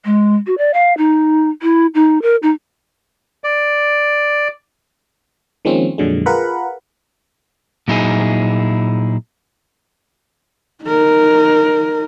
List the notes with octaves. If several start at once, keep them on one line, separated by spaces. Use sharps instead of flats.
G#3
F#4
D5
F5
D#4
E4
D#4
A#4
D#4
D5
D#3 F3 G#3 A#3 C4 C#4
F2 A#2 D3 F#3 G#3
F4 G#4 A#4 B4 F#5 B5
A#2 F#3 D#4 E4 G#4
D#4 A#4